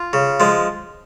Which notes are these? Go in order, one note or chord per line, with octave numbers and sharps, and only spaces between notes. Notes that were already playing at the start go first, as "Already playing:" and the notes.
Already playing: F4
C#3
F3 G#3